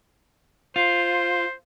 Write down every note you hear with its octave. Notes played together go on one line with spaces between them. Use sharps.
F4 C5